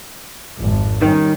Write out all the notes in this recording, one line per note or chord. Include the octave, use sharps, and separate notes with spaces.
G#1 F2
D#3 G3 C#4